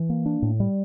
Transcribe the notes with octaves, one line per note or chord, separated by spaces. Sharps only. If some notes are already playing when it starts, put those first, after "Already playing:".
Already playing: E3
A#3
D4
A2
G3